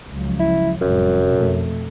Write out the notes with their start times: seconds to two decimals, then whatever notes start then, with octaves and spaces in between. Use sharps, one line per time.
0.11 C#2 F3 F#3
0.40 E4
0.81 F1 F#2 A2 G3
1.32 F2 B2 A3